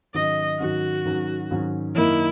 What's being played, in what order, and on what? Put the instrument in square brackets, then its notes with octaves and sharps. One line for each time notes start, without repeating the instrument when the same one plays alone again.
[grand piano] G#2 D#3 F#3 C#4 [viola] D#5
[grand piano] G#2 D#3 F#3 C#4 [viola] F#4
[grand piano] G#2 D#3 F#3 C#4
G#2 D#3 F#3 C#4
[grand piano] F#2 D#3 A#3 D#4 A#4 [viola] E4